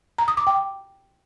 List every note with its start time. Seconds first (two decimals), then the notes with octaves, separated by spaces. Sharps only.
0.18 A#5
0.28 D#6
0.37 D6
0.47 G5